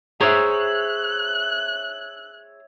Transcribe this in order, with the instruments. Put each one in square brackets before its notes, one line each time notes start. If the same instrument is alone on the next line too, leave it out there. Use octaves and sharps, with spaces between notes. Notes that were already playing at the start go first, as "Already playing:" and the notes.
[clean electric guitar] G#4 C5 A#5 [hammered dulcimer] C#5 E5 [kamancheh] F#6